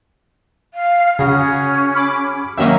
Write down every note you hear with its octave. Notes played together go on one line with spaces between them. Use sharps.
F5
C#3 C#4 F#4 G#4
B5 D6
D#3 F#3 A#3 C#4 E5